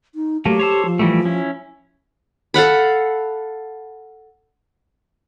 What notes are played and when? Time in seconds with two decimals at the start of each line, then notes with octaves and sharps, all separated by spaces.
0.15 D#4
0.45 F#3 A3 A#3 G4
0.59 A4 C5 C#5
0.86 F3
0.99 E3 G3 A3
1.25 C#4 E4
2.54 A4 F5 F#5 B5